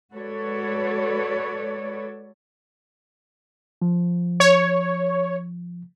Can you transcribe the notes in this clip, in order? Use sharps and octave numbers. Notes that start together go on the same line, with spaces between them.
G#3 F#4 A4 B4 C#5 D5
F3
C#5